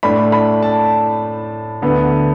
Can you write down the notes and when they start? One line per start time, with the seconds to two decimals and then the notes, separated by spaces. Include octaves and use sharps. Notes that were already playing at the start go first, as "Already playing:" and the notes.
0.03 A2 A3 D4 B5
0.32 B5
0.63 A5
1.82 D2 D3 B3